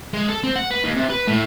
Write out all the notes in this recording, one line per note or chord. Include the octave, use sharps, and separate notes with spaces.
G#3
A4
C4
F#5
B4
D#2
C3
B4
A2